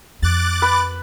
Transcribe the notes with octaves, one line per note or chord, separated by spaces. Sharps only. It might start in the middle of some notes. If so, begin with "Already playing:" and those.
F2 D6 F#6 A6
B4